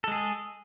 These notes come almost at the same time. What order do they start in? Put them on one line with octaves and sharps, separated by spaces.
A4 G#3 G#4